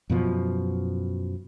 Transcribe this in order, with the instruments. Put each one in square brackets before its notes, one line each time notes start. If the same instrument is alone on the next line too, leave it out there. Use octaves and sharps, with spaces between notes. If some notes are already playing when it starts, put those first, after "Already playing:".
[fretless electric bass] F#2 B2 F3